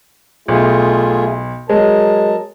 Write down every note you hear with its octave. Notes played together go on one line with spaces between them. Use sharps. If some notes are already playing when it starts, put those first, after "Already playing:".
B1 A3 F4 G#4
F#3 G#3 A#4 A5